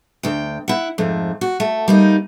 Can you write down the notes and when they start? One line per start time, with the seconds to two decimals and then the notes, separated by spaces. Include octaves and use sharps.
0.23 D2 G5
0.68 E4 F#5
0.98 F2 G#2 A3
1.41 F#4
1.60 A3
1.88 G3 A#3 D#4